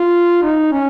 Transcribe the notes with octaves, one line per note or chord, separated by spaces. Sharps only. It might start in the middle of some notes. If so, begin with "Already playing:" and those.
Already playing: F4
D#4
C#4